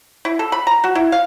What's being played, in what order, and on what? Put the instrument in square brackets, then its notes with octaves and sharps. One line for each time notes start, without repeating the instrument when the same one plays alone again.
[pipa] E4
A4
B5
A#5
F#4
E4
F5